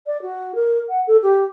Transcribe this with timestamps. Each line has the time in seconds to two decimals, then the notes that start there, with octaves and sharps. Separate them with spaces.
0.06 D5
0.22 F#4
0.55 A#4
0.89 F#5
1.07 A4
1.22 G4